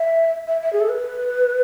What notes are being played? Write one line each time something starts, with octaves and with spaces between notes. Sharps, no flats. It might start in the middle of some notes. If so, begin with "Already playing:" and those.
Already playing: E5
E5
E5
G#4
A4
B4